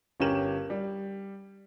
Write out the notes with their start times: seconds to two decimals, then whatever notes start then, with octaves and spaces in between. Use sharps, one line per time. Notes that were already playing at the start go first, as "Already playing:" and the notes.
0.20 G1 C#4 G4 A#4 E7 F#7
0.70 G3